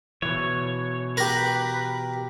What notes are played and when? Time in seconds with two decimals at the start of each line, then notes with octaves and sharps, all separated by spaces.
0.22 B2 E3 C#5
1.17 G4 A#4 B4